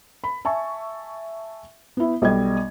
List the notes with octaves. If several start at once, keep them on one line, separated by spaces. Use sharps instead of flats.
B5
E5 G#5 A5 C#6
B3 E4
B1 G3 D#5 G#6